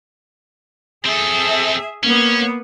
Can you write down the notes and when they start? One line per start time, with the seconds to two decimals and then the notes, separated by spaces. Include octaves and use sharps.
1.06 C4 G#4 A4 E5
2.03 A#3 B3 C#4